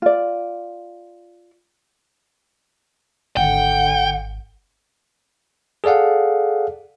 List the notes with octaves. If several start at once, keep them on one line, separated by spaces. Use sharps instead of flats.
F4 D5
G#1 D3 F#5 G5
G#4 A4 D5 F5 F#5